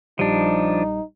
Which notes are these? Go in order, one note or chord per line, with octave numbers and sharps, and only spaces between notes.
A#1 F3 G3 D4 D#4